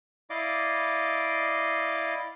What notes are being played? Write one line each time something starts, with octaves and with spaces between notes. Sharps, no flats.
E4 D5 D#5 F5 D6